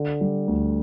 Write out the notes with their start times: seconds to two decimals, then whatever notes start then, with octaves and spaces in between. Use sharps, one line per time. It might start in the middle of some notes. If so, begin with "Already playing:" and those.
Already playing: D3
0.21 G3
0.48 D2